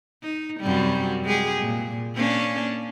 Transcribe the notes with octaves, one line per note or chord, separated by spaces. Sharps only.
D#4
F#2 C3 G3
G#3 G4 G#4
A#2
A#3 C#4 D4